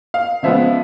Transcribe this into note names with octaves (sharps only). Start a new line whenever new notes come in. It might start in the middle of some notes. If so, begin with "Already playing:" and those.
F5
C#3 F3 G#3 B3 E5